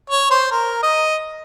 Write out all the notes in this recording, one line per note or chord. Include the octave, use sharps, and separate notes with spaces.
C#5
C5
A#4
D#5